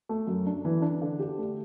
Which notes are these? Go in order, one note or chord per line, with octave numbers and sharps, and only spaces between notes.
A3
F#2
D4
E3
D4
D3
G4
A3